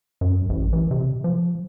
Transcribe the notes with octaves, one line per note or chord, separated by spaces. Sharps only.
F#2
A1
E3
C3
F3